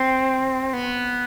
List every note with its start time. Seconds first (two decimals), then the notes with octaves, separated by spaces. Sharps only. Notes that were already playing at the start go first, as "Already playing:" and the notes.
Already playing: C4
0.73 B3